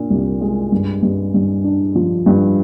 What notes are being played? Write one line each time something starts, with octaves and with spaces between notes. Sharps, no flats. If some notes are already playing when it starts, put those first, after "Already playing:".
Already playing: A#2 D4
C2
G#3
G2
G2
G2
D4
F3
G2